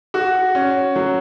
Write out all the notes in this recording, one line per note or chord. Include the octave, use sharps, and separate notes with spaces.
F#4
C#4
F#3